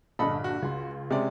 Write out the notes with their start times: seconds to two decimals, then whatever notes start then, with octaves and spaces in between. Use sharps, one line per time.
0.19 A#1 G2 D3 A4 D#5 B5
0.44 F#4
0.62 C#2 C6
1.10 C3 G#3 C#4 D5